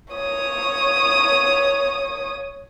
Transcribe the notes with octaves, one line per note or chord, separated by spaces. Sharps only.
C#5 D#6